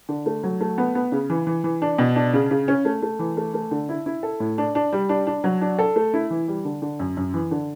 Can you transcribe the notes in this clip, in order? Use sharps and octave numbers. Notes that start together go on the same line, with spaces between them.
D3
A3
F#3
A3
B3
B3
C#3
E3
E3
E3
D4
B2
D4
C#3
C#3
C#4
A3
A3
E3
A3
A3
D3
E4
E4
A4
A2
D4
D4
G3
D4
D4
F#3
D4
A4
A3
E4
E3
G3
D3
D3
F#2
F#2
E3
D3